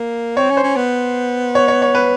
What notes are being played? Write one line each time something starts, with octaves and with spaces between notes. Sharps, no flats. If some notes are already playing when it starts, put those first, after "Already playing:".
Already playing: A#3
C4 C#5
C#4
C5
C#4
B3
C#5
C#5
C#5
B4